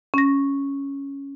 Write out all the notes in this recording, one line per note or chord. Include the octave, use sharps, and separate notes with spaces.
C#4 A#6